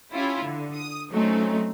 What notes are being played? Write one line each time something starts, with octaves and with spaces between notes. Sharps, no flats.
C#4 E4 F4 G4
D3
D#6
F#3 A3 C4 C#4 D#4